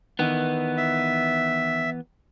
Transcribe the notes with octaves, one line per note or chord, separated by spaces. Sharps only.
D#3 E3 B3
E5